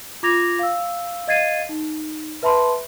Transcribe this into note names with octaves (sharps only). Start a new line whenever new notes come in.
F4 D6 G#6 A#6 F7
F5 E6
D#5 F5 G#6 A6 C7 D#7
D#4
B4 E5 A5 B5 C6